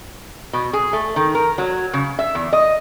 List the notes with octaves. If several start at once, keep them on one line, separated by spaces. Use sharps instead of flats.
B2
G#4
A3
D#3
A#4
F#3
C#3
E5
E2
D#5